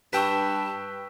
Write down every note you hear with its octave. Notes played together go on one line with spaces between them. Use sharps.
G2 B4 G5 A5 C#6 E6 B6